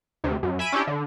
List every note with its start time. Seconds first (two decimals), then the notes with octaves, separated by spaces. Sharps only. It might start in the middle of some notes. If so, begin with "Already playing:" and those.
0.24 D2 C3
0.43 F#2
0.59 E5 G#5 B5 B6 D7 D#7
0.72 C#4 D4 E4 G4 D5
0.87 D3